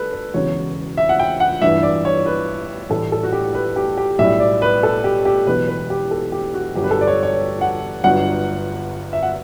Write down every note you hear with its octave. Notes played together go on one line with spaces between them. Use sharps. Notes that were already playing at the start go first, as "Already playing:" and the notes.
Already playing: G3 A4 B4
B4
E1 E2 C#3 F#3 C#5
E5
F#5
G5
F#5
A1 G2 E3 E5
D5
C#5
B4
A1 A2 G3 A4
A4
F#4
G4
B4
G4
G4
B1 A2 G3 E5
D5
B4
A4
G4
G4
E1 E2 B2 F#3 B4
B4
G4
A4
G4
F#4
G1 G2 F#3 G4
B4
A4
D5
C#5
C#5
F#5
G1 G2 F#3 F#5
E5
F#5